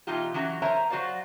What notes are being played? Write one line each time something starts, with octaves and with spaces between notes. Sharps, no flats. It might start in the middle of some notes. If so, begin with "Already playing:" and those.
B2 E3 D#4 F4 G4
E3 F#3 C#4 F#4 G4
A#4 C5 C#5 E5 G#5 A#5
F#3 F#4 C5 D5 F5